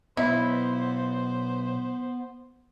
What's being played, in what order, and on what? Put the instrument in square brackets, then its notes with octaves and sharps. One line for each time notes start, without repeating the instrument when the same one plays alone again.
[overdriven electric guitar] B1 [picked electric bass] B3 [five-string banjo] E4 [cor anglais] C5